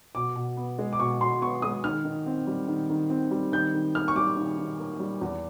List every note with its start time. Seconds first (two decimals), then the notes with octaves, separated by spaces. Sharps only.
0.15 B2 D6
0.36 B2
0.57 B3
0.79 G#3
0.93 D6
1.00 B2 C#6
1.21 B2 C6
1.42 B3 C#6
1.62 G#3 D#6
1.84 D#3 F6
2.05 D#3
2.26 C4
2.47 G3
2.68 D#3
2.90 D#3
3.10 C4
3.31 G3
3.52 D#3 G6
3.74 D#3
3.95 A#3 F6
4.08 C#6
4.16 G3 D6
4.37 D#3
4.58 D#3
4.80 A#3
5.00 G3
5.21 E2